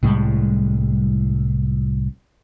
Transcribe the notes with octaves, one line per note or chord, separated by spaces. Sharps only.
C2 A2 G3 G#3